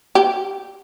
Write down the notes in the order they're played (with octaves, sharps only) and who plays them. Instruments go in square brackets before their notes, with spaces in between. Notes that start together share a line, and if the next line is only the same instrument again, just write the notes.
[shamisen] G4